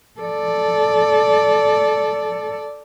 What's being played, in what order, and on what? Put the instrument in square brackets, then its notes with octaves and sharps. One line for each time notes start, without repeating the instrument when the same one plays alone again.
[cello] A4 D5